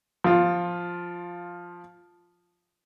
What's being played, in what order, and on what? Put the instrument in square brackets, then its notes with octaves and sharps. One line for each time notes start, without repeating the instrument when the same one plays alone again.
[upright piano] F3 F4